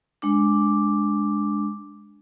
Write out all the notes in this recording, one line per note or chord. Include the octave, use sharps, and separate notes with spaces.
G#3 D4 D6